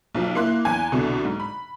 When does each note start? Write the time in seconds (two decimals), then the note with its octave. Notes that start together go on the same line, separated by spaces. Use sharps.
0.15 B1 F3
0.35 A#3 E4 C6 F#6
0.65 E2 G#5
0.92 C2 B2 D3
1.25 G#2
1.40 B5